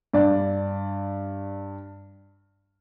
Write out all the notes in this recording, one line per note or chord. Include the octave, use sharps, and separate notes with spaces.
G2 D5